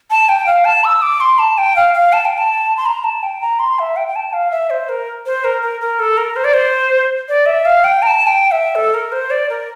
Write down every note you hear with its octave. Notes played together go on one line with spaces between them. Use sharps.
A5
G5
F5
A5
E6
D6
C6
A5
G5
F5
F5
A5
G5
A5
C6
A#5
A5
G5
A#5
C6
E5
G5
G5
A5
F5
E5
C5
A#4
C5
A#4
A#4
A#4
A4
A#4
C5
D5
C5
D5
E5
F5
G5
A#5
A5
G5
E5
A4
A#4
C5
D5
A#4